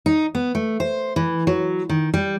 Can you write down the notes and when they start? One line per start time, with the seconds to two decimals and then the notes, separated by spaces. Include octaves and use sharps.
0.06 D#4
0.35 B3
0.55 A3
0.80 C5
1.16 E3
1.47 F#3
1.89 D#3
2.14 G3